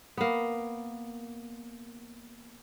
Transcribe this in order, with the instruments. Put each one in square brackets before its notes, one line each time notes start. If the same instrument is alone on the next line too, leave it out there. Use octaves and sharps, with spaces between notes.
[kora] A#3 B3